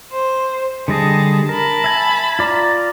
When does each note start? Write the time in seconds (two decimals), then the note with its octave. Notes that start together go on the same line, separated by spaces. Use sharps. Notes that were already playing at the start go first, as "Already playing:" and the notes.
0.11 C5
0.88 D3 G3 G#4 D#5 A5
1.49 A#4 A5 B5
1.84 E5 G#5
2.39 F4 D5 A#5